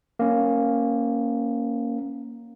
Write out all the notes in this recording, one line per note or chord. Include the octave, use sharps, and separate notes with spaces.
A#3 C#4